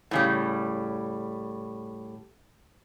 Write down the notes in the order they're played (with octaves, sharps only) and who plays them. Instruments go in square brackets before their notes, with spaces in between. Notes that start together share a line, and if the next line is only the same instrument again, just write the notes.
[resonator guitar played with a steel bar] A2 C#3 G3